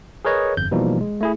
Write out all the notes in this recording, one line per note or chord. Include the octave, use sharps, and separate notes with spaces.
G#4 A#4 B4 C#5 D#5
G1 F2 G6
B2 E3 F3 G3 A#3 D#4
G#3
A3 E4 G#4